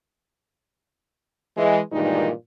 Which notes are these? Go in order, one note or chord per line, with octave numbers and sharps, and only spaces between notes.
E3 G#3
G2 A#2 D#3 E3 G#3 D#4